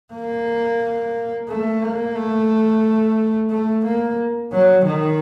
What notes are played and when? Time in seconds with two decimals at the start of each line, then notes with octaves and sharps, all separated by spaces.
0.13 A#3
1.49 A3
1.82 A#3
2.15 A3
3.51 A3
3.85 A#3
4.52 F#3
4.86 D#3